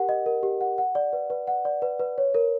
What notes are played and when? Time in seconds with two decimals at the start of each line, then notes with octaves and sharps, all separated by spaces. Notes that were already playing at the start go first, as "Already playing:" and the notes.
Already playing: G4 A#4 F#5
0.09 D#5
0.26 A#4
0.43 G4
0.61 F#5
0.78 F#5
0.95 D5
1.13 B4
1.30 B4
1.47 F#5
1.65 D5
1.82 B4
1.99 B4
2.18 C#5
2.35 A#4